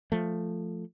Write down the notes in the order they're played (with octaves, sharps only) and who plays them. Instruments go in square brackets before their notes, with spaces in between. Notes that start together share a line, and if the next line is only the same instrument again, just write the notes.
[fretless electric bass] F3 A3